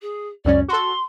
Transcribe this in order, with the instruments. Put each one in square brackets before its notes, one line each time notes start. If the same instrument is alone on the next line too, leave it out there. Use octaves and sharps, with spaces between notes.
[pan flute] G#4
[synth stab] C#2 F#2 C#4 [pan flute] D5
[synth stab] F#4 A4 [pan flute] C6